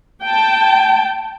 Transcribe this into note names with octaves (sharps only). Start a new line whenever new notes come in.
G5 A5